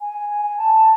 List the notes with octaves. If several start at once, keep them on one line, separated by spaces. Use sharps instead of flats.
G#5
G#5
A5